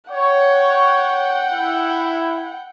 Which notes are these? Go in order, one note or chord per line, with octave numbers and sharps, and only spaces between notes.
C#5 F#5 G5
E4